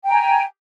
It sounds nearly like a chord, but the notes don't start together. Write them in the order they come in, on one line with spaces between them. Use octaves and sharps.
G5 A#5 G#5